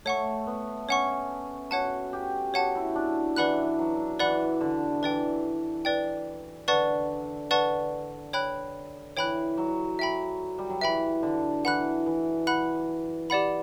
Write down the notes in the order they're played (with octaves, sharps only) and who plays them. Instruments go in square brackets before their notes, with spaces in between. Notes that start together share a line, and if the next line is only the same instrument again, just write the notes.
[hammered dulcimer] A3 [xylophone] C#5 F#5 C#6
[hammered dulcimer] B3
[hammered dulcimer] C#4 [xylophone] C#5 F#5 C#6
[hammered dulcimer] F#4 [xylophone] C#5 F#5 A5
[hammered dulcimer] G4
[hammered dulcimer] F#4 [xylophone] C#5 F#5 A5
[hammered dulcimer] E4
D4
[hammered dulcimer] E3 [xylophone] B4 D5 F#5 B5 F#6
[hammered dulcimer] F#3
[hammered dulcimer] E3 [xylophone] B4 D5 F#5 B5 F#6
[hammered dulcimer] D3
[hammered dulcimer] E3 [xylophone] B4 D5 G5
[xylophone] B4 D5 G5
[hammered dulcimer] D3 [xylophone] B4 D5 F#5 A5 C#6
[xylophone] B4 D5 F#5 A5 C#6
C#5 G5 B5 F#6
[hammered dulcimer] E3 [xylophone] C#5 G5 B5 F#6
[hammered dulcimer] F#3
[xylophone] E5 G5 B5
[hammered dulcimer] G3
F#3
[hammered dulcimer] E3 [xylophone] E5 G5 B5
[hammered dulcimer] D3
[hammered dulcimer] E3 [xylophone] F#5 B5 F#6
[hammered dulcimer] E3
[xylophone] F#5 B5 F#6
G4 D5 F#5 B5